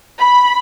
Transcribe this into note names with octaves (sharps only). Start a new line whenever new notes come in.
B5